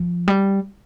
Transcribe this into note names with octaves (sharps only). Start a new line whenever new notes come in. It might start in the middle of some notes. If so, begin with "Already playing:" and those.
Already playing: F3
G3